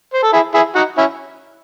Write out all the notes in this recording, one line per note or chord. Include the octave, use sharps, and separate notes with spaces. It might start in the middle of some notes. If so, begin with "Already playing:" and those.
C5
A4
E4 G#4
E4 G#4
D#4 F#4
C#4 E4